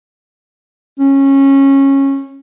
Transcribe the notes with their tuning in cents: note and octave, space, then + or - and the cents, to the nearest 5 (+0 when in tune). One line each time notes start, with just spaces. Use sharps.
C#4 -20